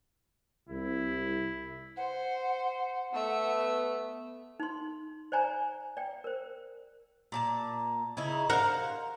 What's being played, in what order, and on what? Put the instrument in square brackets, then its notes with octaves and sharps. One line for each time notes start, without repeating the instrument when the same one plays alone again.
[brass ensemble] C2 [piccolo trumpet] E4
[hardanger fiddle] C5 [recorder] F#5
[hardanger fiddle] A3 E5 [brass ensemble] B3
[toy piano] D#4 C6
C5 D5 G#5 A#5
D5 G5
A#4 C5
[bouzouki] A#2 G4 A5
C#3 D#4 E4
[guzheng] A#4 F#5 [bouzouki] C5 F5